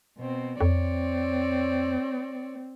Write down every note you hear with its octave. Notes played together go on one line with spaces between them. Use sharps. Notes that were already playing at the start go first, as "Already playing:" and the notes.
B2 C4
F2 C4 C#5 D5